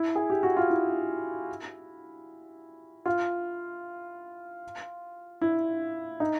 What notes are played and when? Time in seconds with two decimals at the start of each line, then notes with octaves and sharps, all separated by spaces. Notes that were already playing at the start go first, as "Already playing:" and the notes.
Already playing: E4
0.15 G#4
0.30 G4
0.43 F#4
0.57 F4
0.70 E4
3.06 F4
5.42 E4
6.20 D#4